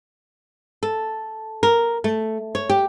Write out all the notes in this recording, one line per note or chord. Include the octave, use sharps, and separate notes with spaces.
A4
A#4
A3
C#5
G4